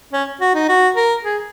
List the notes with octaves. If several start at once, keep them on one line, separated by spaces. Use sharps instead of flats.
C#4
F#4
D#4
F#4
A#4
G#4